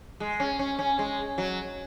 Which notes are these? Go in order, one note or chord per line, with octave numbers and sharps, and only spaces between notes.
G#3
C#4
C#4
C#4
G#3
F#3